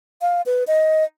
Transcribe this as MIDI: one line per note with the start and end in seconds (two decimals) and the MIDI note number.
0.21 0.42 77
0.46 0.64 71
0.67 1.04 75